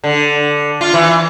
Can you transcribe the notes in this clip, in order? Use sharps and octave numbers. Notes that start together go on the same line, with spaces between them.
D3
F4
E3